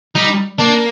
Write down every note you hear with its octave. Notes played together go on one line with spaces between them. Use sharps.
G3 D#4
A#3 D4